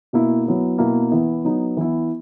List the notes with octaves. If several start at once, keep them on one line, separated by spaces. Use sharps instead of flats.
B2 A#3 E4
F#3 B3 E4
B2 A#3 E4
E3 B3 E4
F#3 B3 D#4
E3 B3 E4